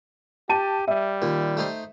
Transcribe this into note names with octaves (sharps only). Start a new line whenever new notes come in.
G4 A5 D#7
G3 E5
D#2 A#2
A3 D#4 C5